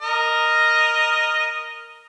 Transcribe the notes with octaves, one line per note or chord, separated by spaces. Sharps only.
A#4 D#5